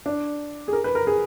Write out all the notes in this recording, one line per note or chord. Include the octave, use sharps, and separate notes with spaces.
D4
G#4
A#4
B4
A#4
G#4